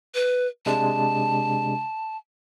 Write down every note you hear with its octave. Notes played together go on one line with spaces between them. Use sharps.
B4
C3 G#3 D4 A5